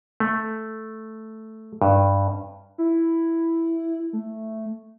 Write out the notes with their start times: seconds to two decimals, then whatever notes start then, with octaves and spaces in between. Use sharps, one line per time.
0.20 A3
1.82 G2
2.78 E4
4.13 A3